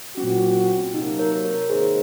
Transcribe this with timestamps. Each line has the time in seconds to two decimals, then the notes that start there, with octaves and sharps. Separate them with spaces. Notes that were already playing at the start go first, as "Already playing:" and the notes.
0.17 A#2 F#3 C4 C#4 F#4
0.94 C3 F#3 A#3 D#4
1.19 A#4 C#5
1.44 A#4 C#5
1.69 G#1 G#2 D#3 A#3 D#4 G#4 C5